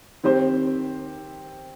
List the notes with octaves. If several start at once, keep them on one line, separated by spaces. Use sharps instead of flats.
D#3 C4 G4 C5